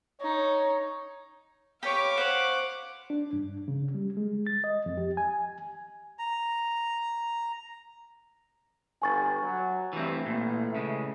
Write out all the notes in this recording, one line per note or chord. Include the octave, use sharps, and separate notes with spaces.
D#4 C#5
G4 B4 C#5 F5 C#6 D6
C5 C#5 F#5
D4
G2
C#3
G3
G#3
A6
D#5
F2
G4
G#5
A#5
G1 G#5 C#6 A6
F#3 F#4
G2 E3 A3 C4
A1 A#2
C#3 G#3